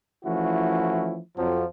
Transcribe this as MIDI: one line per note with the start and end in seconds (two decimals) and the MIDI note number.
0.25 1.18 52
0.25 1.18 53
0.25 1.18 57
0.25 1.18 61
0.25 1.18 64
0.25 1.18 66
1.37 1.64 41
1.37 1.64 53
1.37 1.64 54